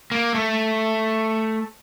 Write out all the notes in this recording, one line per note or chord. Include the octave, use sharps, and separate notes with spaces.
A#3
A3